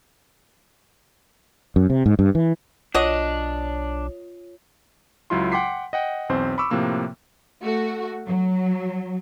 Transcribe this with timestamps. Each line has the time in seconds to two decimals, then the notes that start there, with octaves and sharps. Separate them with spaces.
1.76 F#2
1.90 C3
2.06 G#2
2.19 G2
2.35 E3
2.94 B1 D4 F4 F#4 C#5 D#5
5.30 C#2 F#3 E4 F4 C6
5.52 F#5 G5 C6 D6 B6 C7
5.93 D#5 F#5 G5
6.29 B1 E2 C4 C5
6.58 B5 C#6 D6 E6
6.71 A2 C3 F3 A#3 E6
7.61 A3 F#4
8.26 F#3